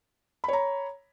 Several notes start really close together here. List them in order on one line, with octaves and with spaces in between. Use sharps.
B5 C#5 A#5